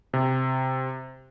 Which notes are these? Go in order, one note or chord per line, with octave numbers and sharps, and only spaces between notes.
C3